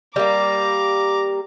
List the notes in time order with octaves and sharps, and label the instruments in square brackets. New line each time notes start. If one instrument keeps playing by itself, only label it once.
[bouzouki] G3 A#3 [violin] A#5 D6